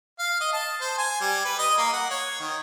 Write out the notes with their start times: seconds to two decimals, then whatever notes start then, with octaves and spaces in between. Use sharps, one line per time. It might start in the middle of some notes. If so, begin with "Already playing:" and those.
0.19 F5
0.41 D#5
0.53 A5
0.81 C5
0.98 G#5
1.21 G3
1.45 B4
1.59 D#5
1.78 A#3
1.93 F#5
2.10 C#5
2.40 D#3